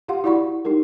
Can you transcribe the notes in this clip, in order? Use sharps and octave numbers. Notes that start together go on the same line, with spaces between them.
F4 G4 F5 F#5 C6
E4 F#4 D5 F#5 B5 C#6
D#4 F4 G4 A#4